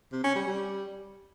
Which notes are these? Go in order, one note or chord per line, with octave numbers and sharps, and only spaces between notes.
C3
C#4
G3
G3